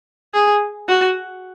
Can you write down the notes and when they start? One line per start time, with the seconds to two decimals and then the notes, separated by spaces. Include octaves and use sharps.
0.34 G#4
0.88 F#4